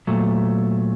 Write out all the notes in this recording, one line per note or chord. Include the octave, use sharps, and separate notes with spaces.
A#2 F#3 A3